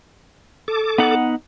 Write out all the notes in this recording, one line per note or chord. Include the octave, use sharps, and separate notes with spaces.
A4 D6
B3 D#4 F#5